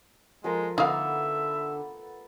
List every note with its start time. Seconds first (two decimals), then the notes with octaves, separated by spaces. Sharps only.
0.44 F3 G#3 A4 A#4
0.78 D3 A3 B3 D#4 A4 E5 F5